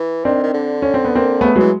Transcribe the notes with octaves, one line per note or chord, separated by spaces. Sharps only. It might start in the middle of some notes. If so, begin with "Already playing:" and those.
Already playing: E3
D#3 C4 D4
D#3
D3
C#4
C4
B3
A#3 C4
C#3 A3 B3
E3 F#3 G#3